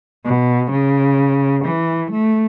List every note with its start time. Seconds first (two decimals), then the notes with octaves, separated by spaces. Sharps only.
0.25 B2
0.71 C#3
1.65 E3
2.11 A3